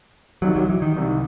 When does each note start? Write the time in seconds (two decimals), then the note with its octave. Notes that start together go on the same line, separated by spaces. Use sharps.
0.42 C2 C3 D#3 F#3
0.56 F#3
0.69 E3
0.82 D#3
0.96 C2 C3 D#3